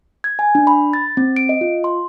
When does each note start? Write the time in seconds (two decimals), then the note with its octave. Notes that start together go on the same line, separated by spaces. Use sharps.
0.24 G#6
0.39 G#5
0.55 D4
0.67 B5
0.93 A6
1.17 C4
1.36 D7
1.49 D#5
1.61 F4
1.84 C6